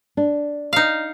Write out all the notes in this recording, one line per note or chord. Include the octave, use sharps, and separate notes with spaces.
D4
D#4 F5